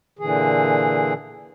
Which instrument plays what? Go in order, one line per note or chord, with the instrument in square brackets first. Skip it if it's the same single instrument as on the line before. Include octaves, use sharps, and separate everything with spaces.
[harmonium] A#2 D3 E3 G#4